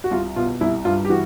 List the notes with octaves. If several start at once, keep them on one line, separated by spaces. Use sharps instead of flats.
F#4
C2 F4
B2 F4
C2 E4
G2 F4
G4
E3 F#4